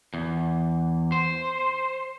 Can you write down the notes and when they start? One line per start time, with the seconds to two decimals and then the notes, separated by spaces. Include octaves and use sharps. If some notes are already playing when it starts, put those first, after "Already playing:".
0.14 E2
1.12 C5